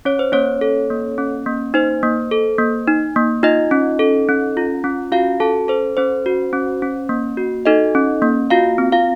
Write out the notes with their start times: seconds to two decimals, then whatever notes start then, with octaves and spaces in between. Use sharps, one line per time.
0.05 C#4 C#5
0.19 C5
0.32 A#3 C#4 C#5
0.61 A4
0.90 A#3
1.18 C#4
1.46 A#3
1.74 D#4 C5
2.03 A#3
2.31 A4
2.58 A#3
2.87 D#4
3.16 A#3
3.43 D#4 F4 D#5
3.71 C#4
3.99 A4
4.29 C#4
4.57 F4
4.84 C#4
5.12 F4 F#4 F5
5.40 C#4 A4 A5
5.68 A4 C5
5.97 C#4 C5
6.26 F#4
6.53 C#4
6.82 C#4
7.09 A#3
7.37 F#4
7.65 D#4 A4 D#5
7.95 C#4
8.22 A#3
8.50 F4 F#4 F5
8.78 C4
8.92 F4 F5